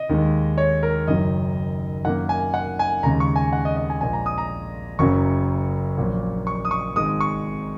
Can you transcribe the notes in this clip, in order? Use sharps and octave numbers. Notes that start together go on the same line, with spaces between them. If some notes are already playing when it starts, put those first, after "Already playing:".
Already playing: D#5
D#2 D#3 G#3
C#5
A#4
F#1 F#2 D#3 F#3 D#5
F#2 D#3 A#3 F#5
G#5
F#5
G#5
D#2 C#3 G#3 A#5
C#6
G#5
F#5
D#5
D#5
G#5
A#1 A#2 G#3 G#5
A#5
D#6
A#5
F#1 F#2 C#3 F#3 C#6
A#1 A#2 F#3 A#3
C#6
D#6
C#6
G#1 G#2 G#3 D#6
C#6